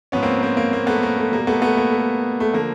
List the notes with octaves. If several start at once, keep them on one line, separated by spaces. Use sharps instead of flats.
G#2 F3 B3 C#4
A#3 C4
A#3 C4
A#3
A#3
A3 B3
A#3
A3
B2 G3 A#3
A3 B3
A3 B3
A#3
A3
A3
D3 F3 A#3